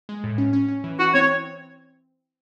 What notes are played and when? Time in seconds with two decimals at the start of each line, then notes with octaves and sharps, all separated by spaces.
0.09 G#3
0.24 A2
0.38 C#4
0.53 C#4
0.69 C#4
0.84 E3
0.99 E4 F#4
1.14 C4 C#5